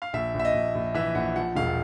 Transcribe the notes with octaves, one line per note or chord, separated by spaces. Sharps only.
F5
A#1 E5
A#1
E5
D#5
A#1
A#1
E3 E5
A#1 F#5
F3 F#5
E1 F5